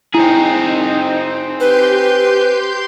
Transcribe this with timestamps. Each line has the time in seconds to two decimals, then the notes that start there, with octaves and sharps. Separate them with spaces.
0.14 C4 D#4 E4 G#4
1.60 G4 B4 C6 G6